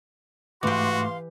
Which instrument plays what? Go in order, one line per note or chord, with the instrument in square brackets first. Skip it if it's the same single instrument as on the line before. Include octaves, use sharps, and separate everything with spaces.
[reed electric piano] G#2 A3 D6 [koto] E3 G4 [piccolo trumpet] F#4 [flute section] F5 C6